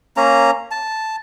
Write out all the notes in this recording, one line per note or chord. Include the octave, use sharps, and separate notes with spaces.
A#3 C#4 A#5
A5